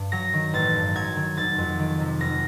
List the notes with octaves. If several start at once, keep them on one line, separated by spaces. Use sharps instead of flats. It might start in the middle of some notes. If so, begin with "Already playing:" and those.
Already playing: G2
F#3 A#6
D#3
A1 A6
G2
F#3 G#6
D#3
F1 A6
F2
D#3
C3
F1 A#6